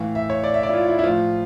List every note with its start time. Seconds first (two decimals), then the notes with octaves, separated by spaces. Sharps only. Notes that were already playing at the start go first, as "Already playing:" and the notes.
Already playing: A2 E3 F5
0.15 E5
0.30 C#5
0.44 D5
0.54 E5
0.63 D5
0.69 E4
0.74 F4
0.88 E4
0.99 E4
1.04 A2 F3 F4